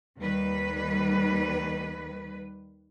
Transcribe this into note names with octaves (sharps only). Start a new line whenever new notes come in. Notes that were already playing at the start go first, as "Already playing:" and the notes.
D#2 D#3 G3 B4